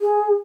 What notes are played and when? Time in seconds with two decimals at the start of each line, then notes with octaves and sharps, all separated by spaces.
0.01 G#4